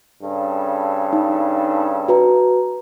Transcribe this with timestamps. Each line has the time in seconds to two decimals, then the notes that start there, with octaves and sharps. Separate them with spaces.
0.22 G2 C#3 A4
1.13 D#4
2.08 F#4 B4 A#5